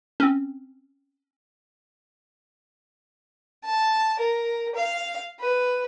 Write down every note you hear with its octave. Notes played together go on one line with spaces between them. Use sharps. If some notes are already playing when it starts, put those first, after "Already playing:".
C4 C#4
A5
A#4
F5
B4